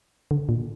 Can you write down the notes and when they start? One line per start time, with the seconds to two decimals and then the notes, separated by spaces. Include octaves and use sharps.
0.31 D3
0.49 A#2